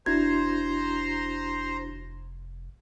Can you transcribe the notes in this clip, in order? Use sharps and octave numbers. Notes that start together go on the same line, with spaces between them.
F1 D4 E4 F#4 C5 A#5 C6 G#6